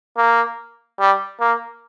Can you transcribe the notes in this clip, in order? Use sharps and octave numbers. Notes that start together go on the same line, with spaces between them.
A#3
G3
A#3